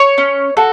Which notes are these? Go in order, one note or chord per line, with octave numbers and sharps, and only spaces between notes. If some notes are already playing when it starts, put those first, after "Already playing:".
Already playing: C#5
C#4
F#4 A4